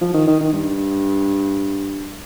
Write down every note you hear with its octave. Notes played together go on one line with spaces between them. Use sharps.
F3
D#3
D#3
D#3
G2